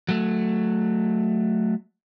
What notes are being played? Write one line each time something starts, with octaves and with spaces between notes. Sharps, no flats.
F#3 A3